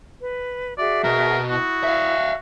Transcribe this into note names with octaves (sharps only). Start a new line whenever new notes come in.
B4
F#4 G#4 D5 E5
B2 B3 A#4
E4 F#4 D#6
E5 F5